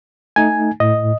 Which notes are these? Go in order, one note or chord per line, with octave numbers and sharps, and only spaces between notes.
A3 D#4 G#5
A2 D#5